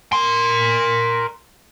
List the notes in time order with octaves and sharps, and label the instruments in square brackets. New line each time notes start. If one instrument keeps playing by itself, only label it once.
[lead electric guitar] A#4 C6